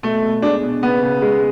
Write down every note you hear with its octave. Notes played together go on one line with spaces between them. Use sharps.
B2 A3
B2
G#3 D4
B2
C#3 B3
C#3
G#3